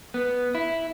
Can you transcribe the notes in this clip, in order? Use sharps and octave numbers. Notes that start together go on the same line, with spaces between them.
B3
E4